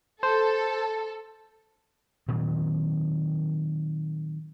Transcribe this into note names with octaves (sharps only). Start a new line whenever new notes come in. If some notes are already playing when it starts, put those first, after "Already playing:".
A4 C5
A#2 D#3 F#3 C4